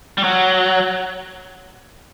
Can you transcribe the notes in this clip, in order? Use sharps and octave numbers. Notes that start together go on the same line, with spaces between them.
G3
F#3